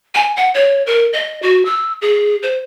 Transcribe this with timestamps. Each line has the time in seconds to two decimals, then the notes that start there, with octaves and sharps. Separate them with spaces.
0.15 G#5
0.37 F#5
0.54 C#5
0.86 A#4
1.13 D#5
1.42 F#4
1.65 E6
2.02 G#4
2.43 C5